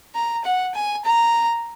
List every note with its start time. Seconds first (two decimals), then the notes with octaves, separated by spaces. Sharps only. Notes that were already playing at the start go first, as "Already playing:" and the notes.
0.15 A#5
0.44 F#5
0.74 G#5
1.04 A#5